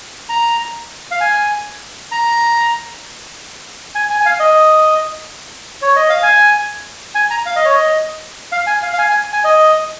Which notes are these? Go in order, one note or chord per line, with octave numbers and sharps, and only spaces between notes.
A#5
F5
G#5
A#5
G#5
G#5
G#5
F5
D#5
C#5
D#5
F5
G#5
G#5
A#5
F5
D#5
C#5
D#5
F5
G#5
F5
F5
G#5
G#5
G#5
D#5